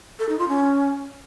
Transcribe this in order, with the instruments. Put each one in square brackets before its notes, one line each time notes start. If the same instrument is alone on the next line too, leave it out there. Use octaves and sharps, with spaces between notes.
[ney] A4
D#4
F4
C#4